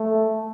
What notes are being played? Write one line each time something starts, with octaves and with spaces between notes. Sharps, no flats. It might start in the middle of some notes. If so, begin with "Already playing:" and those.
Already playing: A3